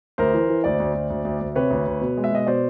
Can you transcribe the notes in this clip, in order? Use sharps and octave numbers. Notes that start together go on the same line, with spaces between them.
D2 A#4 C5
E3
E3
D2 C5 D5
D2
D2
D2
D2
D2
C3 B4 C#5
D2
D2
B2
G#3
E5
B2 D#5
B2 C5 D5